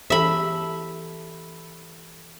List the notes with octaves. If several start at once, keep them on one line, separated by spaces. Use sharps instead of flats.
E3 G4 A4 E5 B5